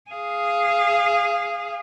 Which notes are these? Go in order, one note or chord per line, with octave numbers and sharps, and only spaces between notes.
G#4 F5